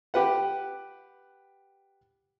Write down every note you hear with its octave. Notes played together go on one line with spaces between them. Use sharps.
G4 B4 F#5